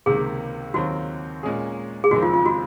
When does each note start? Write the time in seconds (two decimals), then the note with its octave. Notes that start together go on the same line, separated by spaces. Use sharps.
0.06 C#2 C3 D#3 A#3 G#4
0.74 D#2 D#3 F#3 C4 F4 F#4
1.43 A#2 G#3 C#4 G#4
2.04 G#4
2.11 F#1 F2 D#3 G#3 C4 F#4
2.22 F4
2.34 F4
2.46 F#4